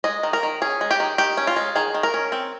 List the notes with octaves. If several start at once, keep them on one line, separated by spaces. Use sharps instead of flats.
G#3 D#5
D#3
A#4
D#3
C#4 G#4
G#3
G4
D#3
D#3 G4
C#4
F4
G#3
D#3 G#4
D#3
A#4
C#4
C4